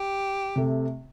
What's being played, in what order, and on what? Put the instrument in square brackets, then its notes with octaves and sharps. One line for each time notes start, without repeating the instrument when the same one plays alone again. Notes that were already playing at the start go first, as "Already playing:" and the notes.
Already playing: [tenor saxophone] G4
[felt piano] C3 A3